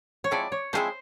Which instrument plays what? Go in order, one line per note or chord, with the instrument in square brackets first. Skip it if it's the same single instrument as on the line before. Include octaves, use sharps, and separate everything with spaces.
[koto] C#5
[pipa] F3 G#3 C4 E4 [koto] D5
[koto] C#5
[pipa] F3 G#3 C4 E4 [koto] C5